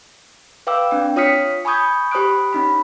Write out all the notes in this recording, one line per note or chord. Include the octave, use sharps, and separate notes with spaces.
B4 F5 G5 D6 E6
C4 D4 G5
F4 C#5 D#6 F6 B6 C#7
G#5 B5 C#6 D#6 G6 G#6
G4 C5 B5 D#6 F#6 D7
C#4 D#4 B5